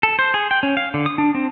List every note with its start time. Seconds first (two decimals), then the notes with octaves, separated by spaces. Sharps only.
0.03 A4
0.19 C5
0.34 G#4
0.51 G5
0.63 C#4
0.77 F5
0.94 D3
1.06 D#6
1.18 D4
1.35 C4